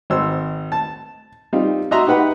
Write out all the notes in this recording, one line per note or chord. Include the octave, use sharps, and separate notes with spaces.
G#1 C5 E6
A5
G3 C4 D#4 F4
F#4 D#5 E5 A#5 C6
D#4 G4 B4 F#5 B5